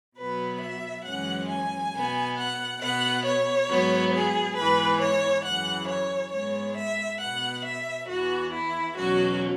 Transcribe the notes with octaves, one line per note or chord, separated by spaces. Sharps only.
B2 F#3 B3 B4
E5
F#2 E3 G#3 C#4 F#5
G#5
B2 B3
F#5
B2 B3 F#5
C#5
G#2 F#3 B3
G#4
G#2 E3 B3 B4
C#5
F#2 C#3 E3 F#5
C#5
G#2 G#3 B3 C#5
E5
B2 B3 F#5
E5
E2 E3 B3 F#4
E4
E2 B2 F#3 C#4 F#4